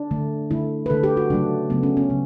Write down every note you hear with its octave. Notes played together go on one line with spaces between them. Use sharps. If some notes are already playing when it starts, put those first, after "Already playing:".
Already playing: D4
D3 A3
D3 A3 E4
B4
D3 A3 A4
G4
F#4
C#3 F#3 A3 D4
C#3 F#3 A3 B3
C#4
C#4
C#3 F#3